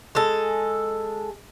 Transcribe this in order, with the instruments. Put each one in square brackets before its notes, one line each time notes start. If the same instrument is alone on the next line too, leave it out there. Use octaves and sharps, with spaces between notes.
[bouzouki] G#3 A4